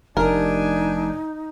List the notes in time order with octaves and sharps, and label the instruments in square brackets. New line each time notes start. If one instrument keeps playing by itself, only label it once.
[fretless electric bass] F1 [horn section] D4 G#5 [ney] D#4 [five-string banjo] A#4